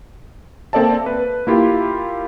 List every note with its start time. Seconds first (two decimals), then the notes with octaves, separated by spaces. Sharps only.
0.73 A#3 C4 A4 D5 E5 A5
1.06 B4
1.47 A#3 E4 F4 G4